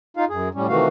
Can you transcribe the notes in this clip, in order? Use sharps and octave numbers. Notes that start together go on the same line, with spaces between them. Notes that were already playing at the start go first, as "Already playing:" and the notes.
D#4 F4 F5
F#2 G#4
A2 G3 C#4
C3 D#3 E3 A3 F#4 F5